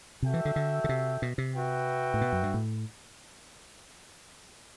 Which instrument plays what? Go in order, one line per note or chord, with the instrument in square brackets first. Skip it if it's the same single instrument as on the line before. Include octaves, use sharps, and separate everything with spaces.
[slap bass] C3 [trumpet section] F#4 A4 E5 G5
[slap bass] E3
D3
D3
D3
C3
B2
C3
[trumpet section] F#4 B4 E5 G5
[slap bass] A2
B2
F#2
G2
A2